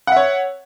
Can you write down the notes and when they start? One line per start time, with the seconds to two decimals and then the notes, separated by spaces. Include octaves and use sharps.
0.07 F#5
0.12 E5
0.16 C#5